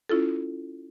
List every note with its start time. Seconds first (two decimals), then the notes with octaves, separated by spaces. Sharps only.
0.09 C#4 E4 F4 A4